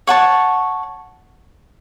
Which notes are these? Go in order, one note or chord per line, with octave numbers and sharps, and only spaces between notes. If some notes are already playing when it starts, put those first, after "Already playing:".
C#5 F#5 A5 C#6